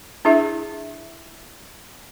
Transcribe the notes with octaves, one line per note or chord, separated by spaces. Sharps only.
D4 E4 G#4 E5